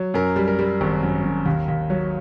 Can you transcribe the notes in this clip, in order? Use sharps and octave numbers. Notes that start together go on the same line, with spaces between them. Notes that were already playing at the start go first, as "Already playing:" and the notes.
Already playing: F#3
F#2 A#4
G3
A#4
G3
G#1
F#2
F#2
D#2
D#2
F#3